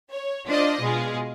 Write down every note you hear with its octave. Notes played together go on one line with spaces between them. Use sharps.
C#5
D4 F4 C5 D5 D#5
B2 G#3 F4 G#4